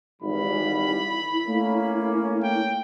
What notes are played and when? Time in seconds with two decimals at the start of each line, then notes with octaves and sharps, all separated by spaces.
0.22 G#1 E3 G3 B5
0.88 E4
1.47 A3 A#3 C#4
2.43 G5